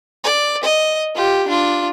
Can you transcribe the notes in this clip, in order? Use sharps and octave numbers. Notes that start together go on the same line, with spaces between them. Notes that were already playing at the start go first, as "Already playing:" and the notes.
D5
D#5
F4 G4
D4 F4